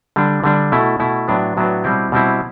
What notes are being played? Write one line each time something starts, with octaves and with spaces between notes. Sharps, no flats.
D3 G3 D4
D3 G3 D4
B2 A3 E4
B2 A3 E4
A2 F#3 B3 D4
A2 F#3 B3 D4
B2 G3 C4 E4
B2 G3 C4 E4